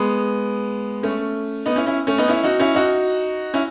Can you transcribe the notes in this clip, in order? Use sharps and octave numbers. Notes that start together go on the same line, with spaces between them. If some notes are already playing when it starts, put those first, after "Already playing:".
Already playing: G#3 B3
A3 C#4
B3 D#4
C#4 E4
C#4 E4
A3 C#4
B3 D#4
C#4 E4
D#4 F#4
C#4 E4
D#4 F#4
C#4 E4